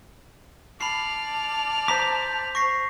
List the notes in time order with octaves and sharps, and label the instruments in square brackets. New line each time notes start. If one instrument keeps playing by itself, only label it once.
[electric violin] D5 F6 [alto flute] A5 [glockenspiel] B5 C7
[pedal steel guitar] C5 A#5 D6 [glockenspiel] B6
[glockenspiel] C#6 A#6 C7